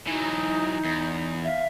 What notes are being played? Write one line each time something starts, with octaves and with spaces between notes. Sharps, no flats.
E3 F#3 D#4
E2
E5 F5